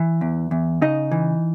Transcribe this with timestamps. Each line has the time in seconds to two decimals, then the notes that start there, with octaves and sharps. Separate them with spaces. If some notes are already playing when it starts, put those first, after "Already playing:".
Already playing: E3
0.21 E2
0.51 E2
0.82 C#3 D#4 D#5
1.11 E3